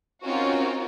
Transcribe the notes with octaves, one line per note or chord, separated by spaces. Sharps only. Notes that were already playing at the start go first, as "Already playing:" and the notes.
C4 C#4 D#4 F4 F#4 A#4